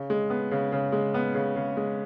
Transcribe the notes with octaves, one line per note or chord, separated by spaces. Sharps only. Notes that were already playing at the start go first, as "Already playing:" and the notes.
Already playing: C#3
G#3
B3
C#3
C#3
G#3
B3
C#3
C#3
G#3